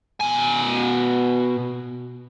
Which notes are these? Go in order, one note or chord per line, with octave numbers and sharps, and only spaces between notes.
B2 G#5